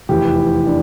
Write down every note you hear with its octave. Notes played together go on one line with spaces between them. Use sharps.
F1 E2 E3 G4
D4